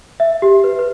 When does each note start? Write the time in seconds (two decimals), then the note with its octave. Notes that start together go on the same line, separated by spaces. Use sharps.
0.20 E5
0.42 G4
0.64 B4
0.79 B4